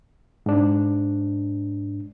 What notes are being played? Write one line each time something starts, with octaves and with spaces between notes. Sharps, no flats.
G#2 D4